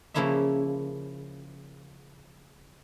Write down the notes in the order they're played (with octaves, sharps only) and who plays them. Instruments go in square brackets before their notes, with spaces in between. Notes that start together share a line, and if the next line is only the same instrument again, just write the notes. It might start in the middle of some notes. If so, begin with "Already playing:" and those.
[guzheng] C#3 F3 A#3 E4 C#5 E5